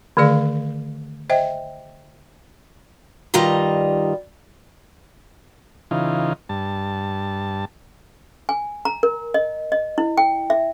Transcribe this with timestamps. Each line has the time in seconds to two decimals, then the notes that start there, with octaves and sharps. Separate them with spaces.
0.17 D3 D#3 A3 G#4 D5 F5
1.30 C5 D#5 E5 G5
3.34 G2 D#3 G3 F4 D#5 A#5
5.91 C#3 E3 D#4 F4
6.49 G2 A5
8.49 G#5
8.85 A#5
9.03 A#4
9.34 D#5
9.72 D#5
9.98 E4
10.18 G5
10.50 E5